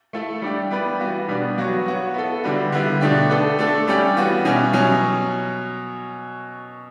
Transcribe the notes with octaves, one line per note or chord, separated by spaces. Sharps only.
A3 E4 A4
G3 D4 G4 D5
G3 B3 E4 B4 D5
E3 B3 F#4
B2 G3 B3 D4
F#3 B3 F#4 C#5
B3 F#4 C#5
B3 E4 A4
D3 G3 D4 F#4 B4
D3 G3 B3 E4
B2 A3 D4 G4
B3 D4 A4
A3 D4 A4
G3 C#4 G4 D5
E3 B3 F#4
B2 G3 C#4 E4
B2 F#3 C#4